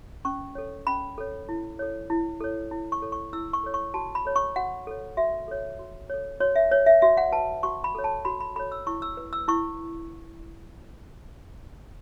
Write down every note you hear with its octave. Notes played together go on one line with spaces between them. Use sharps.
C#4 C#6
A4 C#5
C#4 B5
A4 C#5
E4
A4 C#5
E4
A4 C#5
E4
C#6
A4 C#5
C#6
E4 E6
C#6
A4 C#5
C#6
F#4 A5
B5
A4 C#5
C#6
F#4 F#5
A4 C#5
F#4 E5
A4 C#5
F#4
A4 C#5
F#4 C#5
E5
B4 C#5
E5
F#4 E5
F#5
B4 A5
F#4 C#6
B5
A4 C#5
A5
F#4 B5
B5
A4 C#5 B5
E6
E4 C#6
E6
B4
E6
E4 C#6